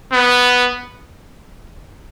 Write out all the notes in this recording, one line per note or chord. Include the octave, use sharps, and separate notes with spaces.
B3